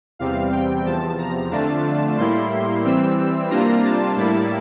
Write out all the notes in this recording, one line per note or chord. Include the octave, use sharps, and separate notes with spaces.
E2 C3 G3 C4 F5
G5
E2 C3 F3 A5
A#5
F2 D3 A3 D4 F4 A5
A2 G3 A#3 E4 C6
E3 G3 C4 E6
C3 G3 A#3 D4 F4 A#5
A5
A2 G3 A#3 E4